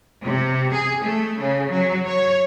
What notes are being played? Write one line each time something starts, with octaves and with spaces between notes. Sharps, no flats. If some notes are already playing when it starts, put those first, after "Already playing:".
C3
G#4
A3
C#3
F#3
C#5